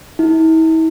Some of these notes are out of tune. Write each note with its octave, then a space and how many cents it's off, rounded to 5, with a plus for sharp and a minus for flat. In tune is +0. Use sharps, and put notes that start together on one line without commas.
E4 -40